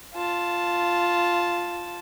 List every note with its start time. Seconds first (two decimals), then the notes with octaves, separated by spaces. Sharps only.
0.14 F4 A5